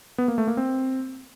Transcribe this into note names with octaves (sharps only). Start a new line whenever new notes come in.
B3
A#3
A3
A#3
C4